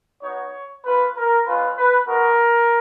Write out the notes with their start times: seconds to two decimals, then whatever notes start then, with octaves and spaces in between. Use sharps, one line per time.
0.23 B3 D#4 F#4 C#5
0.85 A#3 F4 B4
1.16 A#4
1.46 G#3 C#4 F4 B4
1.77 B4
2.07 G#3 B3 F#4 A#4